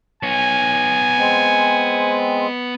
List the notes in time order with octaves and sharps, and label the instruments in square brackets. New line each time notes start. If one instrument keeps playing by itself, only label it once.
[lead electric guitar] B3 C#5 [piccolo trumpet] G#5
[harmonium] G#3 C4